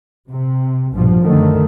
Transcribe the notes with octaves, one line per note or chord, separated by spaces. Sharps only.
C3
A#1 G2 B2 F3
F#2 D3 D#3 A3